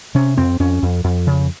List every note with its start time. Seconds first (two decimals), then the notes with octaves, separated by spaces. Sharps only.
0.15 C3 C#4
0.37 F2 C4
0.60 F2 C#4
0.83 F2
1.04 F2
1.27 C#3